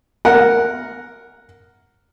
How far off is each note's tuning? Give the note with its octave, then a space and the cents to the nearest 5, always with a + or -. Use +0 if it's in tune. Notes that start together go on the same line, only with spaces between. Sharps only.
A#4 +0 F#5 +0